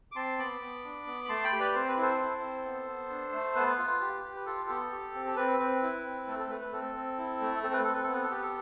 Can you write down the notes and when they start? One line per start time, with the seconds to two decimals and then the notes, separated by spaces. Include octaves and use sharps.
0.12 D6
0.15 C4 A5 C6
0.38 B3 B5 D6
0.62 B3
0.85 D4
1.07 B3
1.25 B5
1.29 A3 A5 C6
1.44 G5 B5
1.52 G4
1.60 B4 D5
1.74 C4 C5
1.88 B4
1.97 E4 A4 C5
2.20 E4
2.42 C4
2.66 B3
2.88 B3
3.10 D4
3.32 A3
3.55 B3 B4
3.79 F4
4.01 G4
4.24 G4
4.36 B4
4.46 F4 A4
4.69 B3
4.92 G4
5.15 C4
5.26 A4
5.36 C4 B4
5.59 C4
5.83 E4
6.05 C4
6.27 A3 A4
6.39 A4
6.50 A3 B4
6.61 B4
6.73 C4 A4
6.95 C4
7.18 E4
7.41 A3
7.63 C4 A4
7.73 B4
7.84 C4 A4
7.94 B4
8.03 A4
8.08 B3 B4
8.24 A4
8.31 G4 B4
8.42 A4